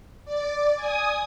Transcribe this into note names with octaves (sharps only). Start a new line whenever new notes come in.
D5
G#5 D#6